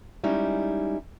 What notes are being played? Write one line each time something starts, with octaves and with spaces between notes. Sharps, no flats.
G3 G#3 C#4 D#4 E4